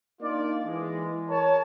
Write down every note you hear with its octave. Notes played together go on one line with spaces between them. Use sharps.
A#3 D4 D#4 F4 D5
E3 G#3
A#4 C#5 A5